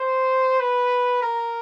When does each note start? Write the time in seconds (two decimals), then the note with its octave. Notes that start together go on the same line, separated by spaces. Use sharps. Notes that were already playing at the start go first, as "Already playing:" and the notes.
Already playing: C5
0.60 B4
1.22 A#4